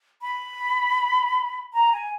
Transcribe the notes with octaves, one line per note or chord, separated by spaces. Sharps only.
B5
A#5
G#5